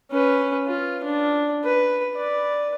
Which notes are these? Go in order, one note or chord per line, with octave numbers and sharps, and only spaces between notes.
C#4 B4
F4
D4
B4
B4 D5